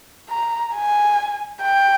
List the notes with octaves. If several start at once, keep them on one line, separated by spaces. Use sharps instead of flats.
A#5
G#5
G5